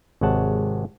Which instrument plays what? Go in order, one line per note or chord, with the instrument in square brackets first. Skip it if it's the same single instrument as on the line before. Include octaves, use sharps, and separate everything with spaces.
[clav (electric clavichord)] G#1 C3 G#3 C#5 F#5 A5